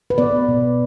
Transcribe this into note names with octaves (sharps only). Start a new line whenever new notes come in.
B4
B3 D5
B2